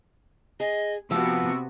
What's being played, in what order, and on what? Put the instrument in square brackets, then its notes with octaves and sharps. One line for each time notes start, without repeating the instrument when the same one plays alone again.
[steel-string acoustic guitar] G#4 [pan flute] D#5
[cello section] C3 B3 F#4 [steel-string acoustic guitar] F3 [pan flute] E6